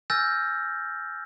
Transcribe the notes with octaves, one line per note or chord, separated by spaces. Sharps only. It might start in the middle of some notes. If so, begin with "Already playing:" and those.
G#5 E6 F6 G6 A6 A#6